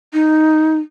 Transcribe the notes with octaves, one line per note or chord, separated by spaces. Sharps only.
D#4